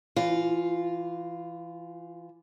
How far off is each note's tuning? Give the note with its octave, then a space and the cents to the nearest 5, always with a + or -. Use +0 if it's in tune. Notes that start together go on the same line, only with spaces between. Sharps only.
E3 +25 F4 +0